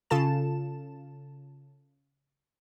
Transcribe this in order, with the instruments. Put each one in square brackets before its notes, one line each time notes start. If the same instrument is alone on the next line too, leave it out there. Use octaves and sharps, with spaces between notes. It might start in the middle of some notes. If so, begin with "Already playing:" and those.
[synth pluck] C#3 F4 A4 A5 E7